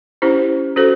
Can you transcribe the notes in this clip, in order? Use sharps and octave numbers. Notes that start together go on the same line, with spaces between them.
C#4 E4 G4 C5
C#4 F#4 A4 C5